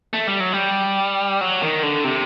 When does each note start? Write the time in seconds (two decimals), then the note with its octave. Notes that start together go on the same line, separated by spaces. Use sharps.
0.13 A3
0.27 G3
0.40 F#3
0.53 G3
1.41 F#3
1.62 D#3
1.83 D3
2.04 C3